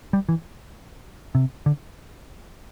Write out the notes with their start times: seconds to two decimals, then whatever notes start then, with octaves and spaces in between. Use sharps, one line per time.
0.13 G3
0.29 E3
1.35 C3
1.66 D3